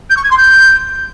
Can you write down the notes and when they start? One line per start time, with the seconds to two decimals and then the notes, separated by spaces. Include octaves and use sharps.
0.10 G6
0.17 C#6
0.23 G#6
0.30 C6
0.37 G6